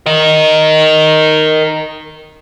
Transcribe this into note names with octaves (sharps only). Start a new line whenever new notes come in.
A#4 D#5